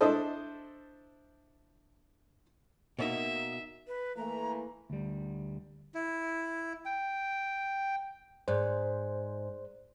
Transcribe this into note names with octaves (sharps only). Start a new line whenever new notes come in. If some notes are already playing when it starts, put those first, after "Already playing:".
D4 E4 A4 C5 D#5
B2 A#3 D#4 E5
B4
E3 A3 A#3 A#5
D2 G3
E4
G5
G#2 G#4 C5 D5 F#6